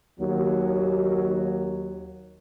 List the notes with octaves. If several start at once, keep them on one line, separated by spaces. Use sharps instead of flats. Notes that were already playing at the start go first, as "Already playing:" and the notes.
D#2 F#3